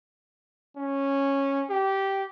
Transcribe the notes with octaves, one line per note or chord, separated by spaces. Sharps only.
C#4
G4